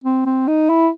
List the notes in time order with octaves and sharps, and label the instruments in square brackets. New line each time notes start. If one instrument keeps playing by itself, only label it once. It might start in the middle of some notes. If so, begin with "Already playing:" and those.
[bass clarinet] C4
C4
D#4
E4